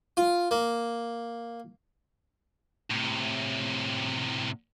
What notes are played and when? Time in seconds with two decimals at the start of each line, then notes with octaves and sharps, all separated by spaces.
0.17 F4
0.51 A#3
2.90 A2 C3